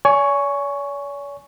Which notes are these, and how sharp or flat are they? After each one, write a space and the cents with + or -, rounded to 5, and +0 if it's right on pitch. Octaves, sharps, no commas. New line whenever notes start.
C#5 +45 G#5 +10 C#6 +5